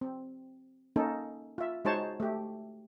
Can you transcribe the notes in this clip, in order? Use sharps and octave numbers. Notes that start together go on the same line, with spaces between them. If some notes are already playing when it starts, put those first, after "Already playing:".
C4
A#3 C#4 D#4 A4
F4 E5
G#3 D#4 F#4 C5 C#5 A5
A3 G4